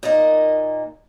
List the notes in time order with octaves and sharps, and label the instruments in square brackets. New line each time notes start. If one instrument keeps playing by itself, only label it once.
[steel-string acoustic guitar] A#2 A#3 D#4 D#5